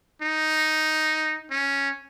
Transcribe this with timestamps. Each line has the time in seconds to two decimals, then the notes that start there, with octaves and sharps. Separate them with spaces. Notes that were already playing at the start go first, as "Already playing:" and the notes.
0.22 D#4
1.51 C#4